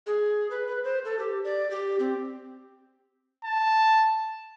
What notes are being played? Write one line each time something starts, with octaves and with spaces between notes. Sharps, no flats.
G#4
B4
B4
C5
A4
G4
D5
G4
C4
A5